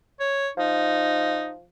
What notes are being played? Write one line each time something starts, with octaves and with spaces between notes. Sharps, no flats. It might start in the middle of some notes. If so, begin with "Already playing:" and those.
C#5
F3 D#4